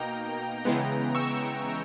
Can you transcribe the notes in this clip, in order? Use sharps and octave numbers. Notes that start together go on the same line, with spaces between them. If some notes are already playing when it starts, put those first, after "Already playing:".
Already playing: B2 A#3 D#4 G5 A#5
C#3 E3 G#3 B3
C#6 E6